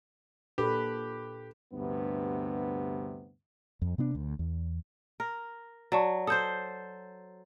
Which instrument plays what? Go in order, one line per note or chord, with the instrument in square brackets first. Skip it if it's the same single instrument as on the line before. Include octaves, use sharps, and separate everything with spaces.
[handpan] A#2 D4 B4 [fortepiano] G4 [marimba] A4
[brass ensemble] D2 G2 C3 B3
[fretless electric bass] F2
C3 B3 D4
D2
E2
[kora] A#4
[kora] F#3 [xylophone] D5 A5 C#6
[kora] A4 C5 [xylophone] D#6 G6